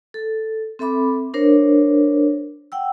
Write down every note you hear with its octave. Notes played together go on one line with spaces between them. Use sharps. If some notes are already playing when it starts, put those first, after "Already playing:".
A4
C4 A4 E5 B5 D6
D4 A#4 C5 C#5
F#5 G5 E6